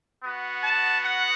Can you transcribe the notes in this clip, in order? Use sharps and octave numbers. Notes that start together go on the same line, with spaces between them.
B3 F#4
A5
F#5